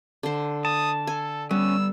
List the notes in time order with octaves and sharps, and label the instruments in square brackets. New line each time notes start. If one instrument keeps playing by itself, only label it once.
[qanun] D3 C5
[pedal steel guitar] A5 [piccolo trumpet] D#6
[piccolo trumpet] A4 [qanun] G#5
[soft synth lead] G3 [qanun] B3 [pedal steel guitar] C#4 [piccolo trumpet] E6